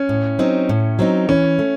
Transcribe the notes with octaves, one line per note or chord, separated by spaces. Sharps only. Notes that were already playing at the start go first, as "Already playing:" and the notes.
Already playing: C#4
A2
F#3 C4 D#4
A2
F#3 C4 D#4
E3 C#4
A3